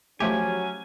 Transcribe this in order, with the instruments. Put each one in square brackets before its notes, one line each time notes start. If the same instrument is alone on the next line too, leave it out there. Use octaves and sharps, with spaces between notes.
[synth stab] F3 A3 G4 [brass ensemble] F#3 C#4 [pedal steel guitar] G#5